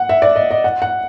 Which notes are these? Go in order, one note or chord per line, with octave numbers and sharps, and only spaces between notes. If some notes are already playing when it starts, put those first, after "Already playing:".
Already playing: F#5
E5
D5
D#5
D#5
F#5
F#5